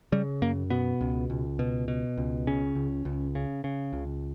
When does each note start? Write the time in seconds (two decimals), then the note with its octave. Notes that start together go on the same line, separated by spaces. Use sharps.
0.12 C#3 G3
0.42 F#2 A#3
0.70 B2 B3
1.01 C#2
1.30 C#2
1.59 B2
1.88 B2
2.18 C#2
2.47 C#3 C#4
2.75 C#2
3.05 C#2
3.35 C#3
3.64 C#3
3.93 C#2